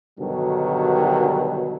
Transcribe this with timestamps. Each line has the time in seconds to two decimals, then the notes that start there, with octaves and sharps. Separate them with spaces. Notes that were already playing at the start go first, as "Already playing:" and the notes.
0.19 G2 B2 D3 D#3 F#3 G3